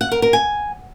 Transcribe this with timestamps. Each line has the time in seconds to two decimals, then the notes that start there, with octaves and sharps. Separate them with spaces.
0.01 F#5
0.12 A#4
0.22 A#4
0.33 G#5